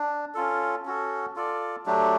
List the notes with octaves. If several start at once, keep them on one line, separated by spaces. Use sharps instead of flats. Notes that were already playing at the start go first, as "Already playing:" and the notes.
Already playing: D4
C#4 F4 A4
C#4 F#4 A4
F4 A4 D5
F#3 A3 D4 G4